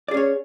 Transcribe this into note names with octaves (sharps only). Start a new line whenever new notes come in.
C#4 G#4 C#5 D5